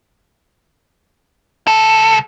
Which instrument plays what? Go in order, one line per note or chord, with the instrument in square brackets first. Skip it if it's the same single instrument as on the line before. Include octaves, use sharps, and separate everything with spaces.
[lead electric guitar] C2 A4